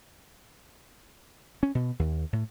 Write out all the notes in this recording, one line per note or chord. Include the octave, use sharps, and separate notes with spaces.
C#4
B2
D#2
A2